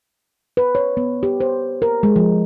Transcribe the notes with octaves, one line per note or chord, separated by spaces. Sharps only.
B4
C#5
B3
G4
C5
A#4
G#3
F3